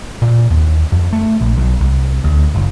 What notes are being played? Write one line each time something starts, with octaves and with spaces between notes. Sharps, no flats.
A#2
D#2
F2
A3
A#1
B1
C2
D2
F#1